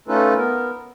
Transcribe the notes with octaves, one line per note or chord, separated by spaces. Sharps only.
A3 C#4 D#4 F4 A4 B4
B3 A#4